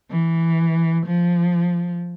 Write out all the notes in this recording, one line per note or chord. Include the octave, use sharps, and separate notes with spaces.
E3
F3